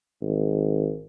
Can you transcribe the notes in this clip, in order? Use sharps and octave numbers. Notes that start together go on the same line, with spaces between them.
G#1